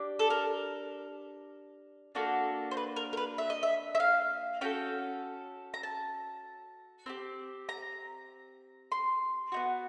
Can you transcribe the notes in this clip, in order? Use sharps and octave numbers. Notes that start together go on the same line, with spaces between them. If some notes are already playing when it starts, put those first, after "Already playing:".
Already playing: D4 G4
A4
A#4
A#3 D4 F#4 A4
C5
B4
A#4
A#4
B4
E5
D#5
E5
E5
F5
C#4 F#4 A4 G5
A#5
A5
C4 D#4 G4
A#5
C6
B3 D#4 F#4